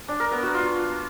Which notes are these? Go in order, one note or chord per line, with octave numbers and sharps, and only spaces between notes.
D4
A#4
B3
F#4
F4